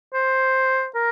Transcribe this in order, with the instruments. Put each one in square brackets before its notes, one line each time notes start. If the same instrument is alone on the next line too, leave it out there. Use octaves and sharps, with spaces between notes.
[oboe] C5
A#4